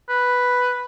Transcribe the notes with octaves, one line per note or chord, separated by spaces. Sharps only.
B4